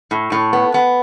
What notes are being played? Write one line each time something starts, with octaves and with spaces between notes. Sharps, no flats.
A2
A2
B3
B3